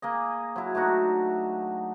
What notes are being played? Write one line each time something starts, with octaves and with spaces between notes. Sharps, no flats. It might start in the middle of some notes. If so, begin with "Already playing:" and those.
A#3 G#4 D#5
F#3 E4
A3 D4 D#4 F#4